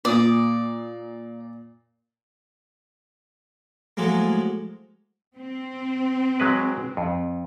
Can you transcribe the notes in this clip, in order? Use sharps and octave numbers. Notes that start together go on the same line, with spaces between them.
A#2 D5 D#6
A2 F3 F#3 G#3 A#3
C4
F#3 G#3 B4
F2